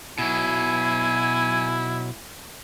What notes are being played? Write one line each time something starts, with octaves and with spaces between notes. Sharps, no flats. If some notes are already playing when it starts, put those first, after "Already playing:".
B2 F#3 E4 G#5